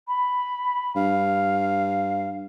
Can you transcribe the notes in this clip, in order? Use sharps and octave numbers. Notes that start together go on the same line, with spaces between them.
B5
G2 F5